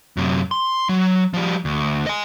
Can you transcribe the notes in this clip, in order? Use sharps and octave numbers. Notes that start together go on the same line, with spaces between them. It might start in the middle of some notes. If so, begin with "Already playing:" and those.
F#2 C3
C6
F#3
F3 G3
D2
D#5 G#5